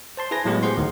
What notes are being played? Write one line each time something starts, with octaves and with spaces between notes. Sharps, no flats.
C5 A5 C6
E4 G#4 B4 G#5 A#6
A2 F#3 G#3 B3 G4
F#4 G#4 C5 F#5 C6
D2 D#3